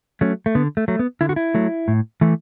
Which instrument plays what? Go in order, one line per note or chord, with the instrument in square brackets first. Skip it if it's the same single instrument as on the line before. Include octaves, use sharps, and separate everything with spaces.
[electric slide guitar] F#3 A3 C#4
A3
D3 B3
A3
F#3 A3
B3
D3 E4
F#4
E4
F#3 A3
A2
E3 A3